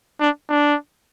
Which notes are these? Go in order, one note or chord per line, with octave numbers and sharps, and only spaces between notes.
D4
D4